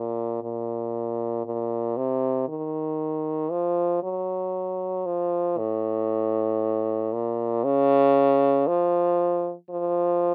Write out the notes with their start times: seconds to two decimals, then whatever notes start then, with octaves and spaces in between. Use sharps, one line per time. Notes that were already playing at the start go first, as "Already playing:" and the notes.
Already playing: A#2
0.42 A#2
1.45 A#2
1.97 C3
2.49 D#3
3.52 F3
4.03 F#3
5.06 F3
5.58 A2
7.13 A#2
7.64 C#3
8.67 F3
9.70 F3